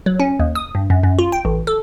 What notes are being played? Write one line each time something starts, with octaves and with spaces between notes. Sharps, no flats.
F#3
C#4
D#2
D#6
G2
F#2
F#2
F4
G5
A1
A4